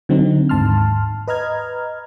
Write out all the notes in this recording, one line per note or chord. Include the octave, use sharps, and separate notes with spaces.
D3 F#3 C4 D#4
D#2 G#2 A5 C6 F6
B4 D#5 A#5 F6 G#6